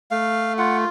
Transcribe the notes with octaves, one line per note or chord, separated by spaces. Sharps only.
A3 F5
F4 F#5